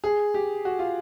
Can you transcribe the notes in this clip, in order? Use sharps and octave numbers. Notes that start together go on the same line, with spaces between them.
G#4
G4
F#4
F4